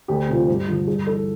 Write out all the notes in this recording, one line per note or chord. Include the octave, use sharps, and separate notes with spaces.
D2 G4
C3 F3
G2
D3 F3
G2 G#4
E3 A4